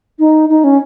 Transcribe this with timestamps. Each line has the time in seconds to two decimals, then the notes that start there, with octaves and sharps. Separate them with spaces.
0.19 D#4
0.49 D#4
0.64 C#4